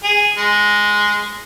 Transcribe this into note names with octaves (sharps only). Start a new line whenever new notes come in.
G#4
G#3